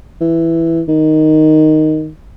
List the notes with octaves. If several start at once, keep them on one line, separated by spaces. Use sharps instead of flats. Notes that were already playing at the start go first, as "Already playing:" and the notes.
E3
D#3